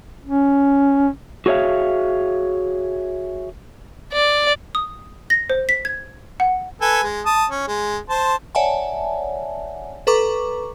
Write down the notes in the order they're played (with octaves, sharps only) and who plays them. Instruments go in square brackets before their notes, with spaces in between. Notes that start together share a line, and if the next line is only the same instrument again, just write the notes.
[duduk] C#4
[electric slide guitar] F#4 G#4 C#5 E5 F5
[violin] D5
[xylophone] D#6
A#6
C5
B6
G#6
F#5
[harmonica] A4 B4 G#5
G#3
A5 D#6
C#4
G#3
C5 A5 C6
[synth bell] C#5 D5 E5 F#5 G#5 A5
A4 B4 A#5 C#6 D6